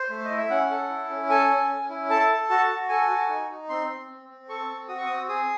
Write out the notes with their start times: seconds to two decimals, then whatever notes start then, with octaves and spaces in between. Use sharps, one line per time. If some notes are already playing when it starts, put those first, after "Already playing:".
Already playing: C5
0.10 A3
0.25 D#5
0.30 E4
0.38 E5
0.50 C#4 F#5
0.71 A4
0.89 E4
1.10 C#4
1.29 A4 G#5
1.50 C#4
1.69 C#4
1.90 E4
2.10 A4 A5
2.29 A4
2.50 F#4 A5
2.69 F#4
2.89 A4 G#5
3.09 F#4
3.29 D#4
3.49 D#4
3.69 C4 C6
3.89 C4
4.09 C4
4.29 C4
4.49 A4 C#6
4.69 C4
4.88 F#4 D#6
4.98 C#6
5.06 C4 D#6
5.29 G#4 D#6